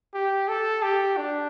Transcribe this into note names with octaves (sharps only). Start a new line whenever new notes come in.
G4
A4
G4
D4